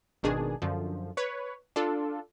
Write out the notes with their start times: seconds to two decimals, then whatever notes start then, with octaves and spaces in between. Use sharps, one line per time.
0.23 G#1 B2 D#3 D4 G#4
0.62 F#2 D3 F3
1.17 B4 C#5
1.76 D4 F4 A4